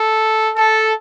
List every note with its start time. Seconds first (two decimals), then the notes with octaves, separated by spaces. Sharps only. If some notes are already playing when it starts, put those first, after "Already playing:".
Already playing: A4
0.56 A4